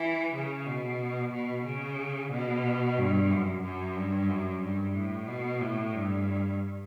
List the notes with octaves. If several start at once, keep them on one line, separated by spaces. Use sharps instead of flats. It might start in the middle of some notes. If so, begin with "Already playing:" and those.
Already playing: E3
C#3
B2
B2
C#3
B2
G2
F#2
F#2
G2
F#2
G2
A2
B2
A2
G2